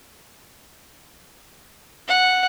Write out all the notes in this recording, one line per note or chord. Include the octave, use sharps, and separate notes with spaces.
F#5